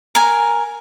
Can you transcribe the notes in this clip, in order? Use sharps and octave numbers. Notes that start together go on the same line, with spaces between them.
A#4 G#5